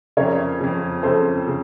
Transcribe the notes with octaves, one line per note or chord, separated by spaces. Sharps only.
F2 C#3 A#4 C#5
F2 C#3
F2 C#3 A4 C5
C#3